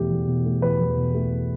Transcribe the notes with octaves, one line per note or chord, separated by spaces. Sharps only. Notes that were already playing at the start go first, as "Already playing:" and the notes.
Already playing: E2 B2 A3 G4
E2
B2
A3
E2 B4
E2
B2
A3